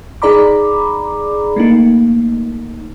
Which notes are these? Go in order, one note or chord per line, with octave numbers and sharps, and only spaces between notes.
D#4 G#4 D5 A#5 B5 D6
A3 A#3 D#4